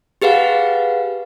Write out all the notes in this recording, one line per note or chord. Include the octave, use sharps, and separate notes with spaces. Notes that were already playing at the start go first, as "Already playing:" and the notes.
G4 G#4 B4 F5 F#5